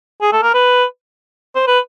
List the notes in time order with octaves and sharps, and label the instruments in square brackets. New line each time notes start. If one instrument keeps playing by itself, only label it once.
[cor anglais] G#4
A4
A#4
B4
C5
B4